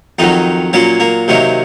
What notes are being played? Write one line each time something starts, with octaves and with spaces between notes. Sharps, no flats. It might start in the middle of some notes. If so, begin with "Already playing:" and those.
F2 D#3 F#3 D#4
A#2 F#3 A#3 C#4
A#3
C3 D#3 F#3 A#3